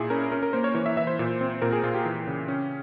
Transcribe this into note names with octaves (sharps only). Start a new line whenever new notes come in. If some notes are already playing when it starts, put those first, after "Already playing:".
Already playing: A#2 E4 G#4
C#4 A#4
C#4 A#4
A#4
A#3 C5
C#5
E3 C#5
E5
E3 E5
C5
A#2
C4
A#2 A#4
G#4
A#2 F4
G4
E3
C#3
C#4